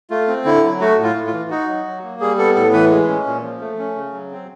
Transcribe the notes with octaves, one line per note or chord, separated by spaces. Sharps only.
A3 F4
C4
D3 E4
F#3
A3 F#4
A2
F4
A2
F4
E3
D#4 F#4
F#3
F#3
A#3
G3 G#4
B3 A4
A2 A4
E3 B4
G#3
C#4
A#2
F3
A3
C#4
C#3
F#3
C4